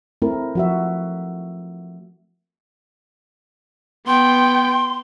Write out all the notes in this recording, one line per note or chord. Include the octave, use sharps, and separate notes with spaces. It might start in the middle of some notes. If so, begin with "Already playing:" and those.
A3 C4 E4 A#4
F3 F#4 E5
B3 G5 C6